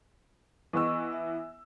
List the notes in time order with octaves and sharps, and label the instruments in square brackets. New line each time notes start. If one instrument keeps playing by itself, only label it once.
[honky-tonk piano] E3 B3 E6 [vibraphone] D#5 C#6
[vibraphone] E5